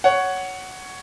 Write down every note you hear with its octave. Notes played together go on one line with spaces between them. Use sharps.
C#5 F#5